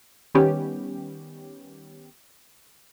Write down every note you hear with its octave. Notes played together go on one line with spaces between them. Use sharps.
D#3 G3 B3 C#4 G4